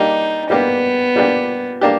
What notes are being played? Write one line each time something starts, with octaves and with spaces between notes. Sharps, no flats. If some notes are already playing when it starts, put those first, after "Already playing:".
Already playing: G3 A#3 D4 D#4 G4
G3 A#3 B3 D4 G4
G3 A#3 D4 G4
A#3 D4 G4